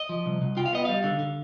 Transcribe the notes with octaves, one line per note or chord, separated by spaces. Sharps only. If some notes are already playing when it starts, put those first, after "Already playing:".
Already playing: D#5
F3
C2
C2
F4 G5
F5
B3 D#5
G3 F5
D3
D3